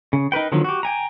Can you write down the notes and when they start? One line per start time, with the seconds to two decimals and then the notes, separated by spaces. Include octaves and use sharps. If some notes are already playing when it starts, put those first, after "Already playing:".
0.13 C#3
0.32 D#4 A#4 B4 G5
0.52 D3 D#3 F3 F#3 B3
0.64 F#4 G4
0.83 G5 G#5 A#5